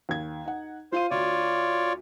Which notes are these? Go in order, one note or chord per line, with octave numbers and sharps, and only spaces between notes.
D#2 G#6
D#4 F#5
F4 C5 F5 D#7
D2 F4 C#5 D5